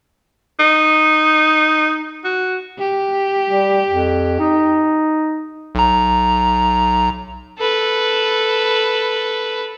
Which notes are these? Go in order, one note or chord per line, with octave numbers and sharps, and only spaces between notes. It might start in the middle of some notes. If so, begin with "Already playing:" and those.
D#4
F#4
G4
G3
F2
D#4
B1 A#5
A4 B4